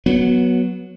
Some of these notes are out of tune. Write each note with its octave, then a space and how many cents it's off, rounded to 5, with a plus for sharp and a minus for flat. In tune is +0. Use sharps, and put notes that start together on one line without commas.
F#3 +0 B3 -20